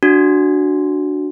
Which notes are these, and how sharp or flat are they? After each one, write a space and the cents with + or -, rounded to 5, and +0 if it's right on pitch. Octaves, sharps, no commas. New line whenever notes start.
D4 +0 F#4 +0